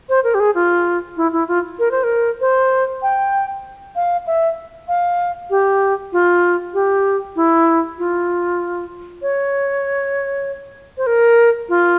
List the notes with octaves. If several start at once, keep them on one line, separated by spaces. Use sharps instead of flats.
C5
A#4
G4
G#4
F4
E4
E4
F4
A#4
C5
A#4
C5
G5
F5
E5
F5
G4
F4
G4
E4
F4
C#5
C5
A#4
F4